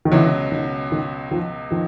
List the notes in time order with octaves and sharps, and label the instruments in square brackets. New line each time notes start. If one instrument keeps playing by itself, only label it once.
[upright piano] D#3
[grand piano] C#2 B2 F#3 [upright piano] D3 E3
[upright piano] D#3
D#3
D#3 F3
D#3 F3